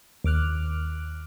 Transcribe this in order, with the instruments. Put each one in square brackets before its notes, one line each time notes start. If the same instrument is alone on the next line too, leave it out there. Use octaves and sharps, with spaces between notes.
[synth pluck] D#2 D6 F6 F#6